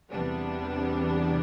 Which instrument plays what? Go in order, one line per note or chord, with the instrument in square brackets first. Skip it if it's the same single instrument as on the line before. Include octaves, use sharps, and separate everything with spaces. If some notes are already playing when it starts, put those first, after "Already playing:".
[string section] E2 C3 G3 B3 D4